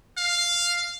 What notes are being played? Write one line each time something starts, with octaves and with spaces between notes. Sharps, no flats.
F5